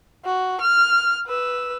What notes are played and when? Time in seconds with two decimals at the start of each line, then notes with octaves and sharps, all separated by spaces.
0.24 F#4
0.61 F6
1.26 B4 E6